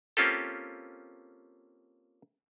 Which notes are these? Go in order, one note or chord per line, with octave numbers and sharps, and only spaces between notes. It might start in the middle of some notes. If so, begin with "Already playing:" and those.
A#3 C4 C#4 F4 G4 A4